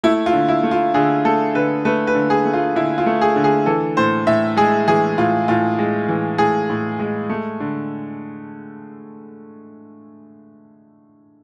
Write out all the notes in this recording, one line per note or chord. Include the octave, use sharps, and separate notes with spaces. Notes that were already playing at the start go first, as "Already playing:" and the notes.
A3 E4
F4
D3
E4
A3
F4
D3 G#4
A3 A4
D3 B4
A3 B4
B4
D3
G#4
A3
F4
D3 E4
F4
A3
G#4
D3
G#4
E3 A4
A2 C5
A2 E5
G#3 G#4
E3 G#4
A2 F4
A2 F4
G#3
E3
A2 G#4
A2
G#3
A3
D3